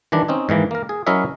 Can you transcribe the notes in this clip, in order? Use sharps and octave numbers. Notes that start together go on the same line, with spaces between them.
D#3 E3 G3 D4
C4 C#4 D#4
G#2 D#3 E3 A#3
A#3 A#4
G#4
F#3 C#4 E4 A#4 D#5 E5